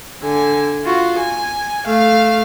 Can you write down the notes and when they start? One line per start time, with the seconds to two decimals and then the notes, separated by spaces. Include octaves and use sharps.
0.23 D3 G#5
0.84 F4 F#4
1.19 G#5
1.86 A3 F5